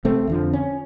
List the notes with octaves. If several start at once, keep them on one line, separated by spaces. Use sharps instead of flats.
C3 A3 C4
F2 D3 F3
C#4